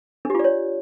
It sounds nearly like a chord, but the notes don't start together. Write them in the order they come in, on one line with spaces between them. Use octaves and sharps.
D4 G4 F4 D5 C#5